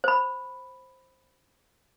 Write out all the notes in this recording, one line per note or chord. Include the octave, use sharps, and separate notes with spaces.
C5 B5